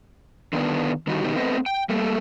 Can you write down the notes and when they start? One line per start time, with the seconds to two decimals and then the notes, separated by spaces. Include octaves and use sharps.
0.53 D3 D#3 B3 D4
1.07 D3 D#3 G3 D#4 F#4
1.24 B2 D#3 B3 D#4 G4
1.36 A3 B3 C4 B4 C5 D#5
1.66 G5
1.89 G3 A3 A#3 A4